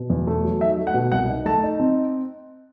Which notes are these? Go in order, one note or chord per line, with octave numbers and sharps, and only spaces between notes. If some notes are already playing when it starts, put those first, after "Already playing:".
Already playing: B2
E2
A3
F#3
D#4 E5
A3
F#5
B2
C2 F#5
D#4
A3 A5
D#4
C4